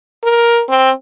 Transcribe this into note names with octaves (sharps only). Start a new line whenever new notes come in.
A#4
C4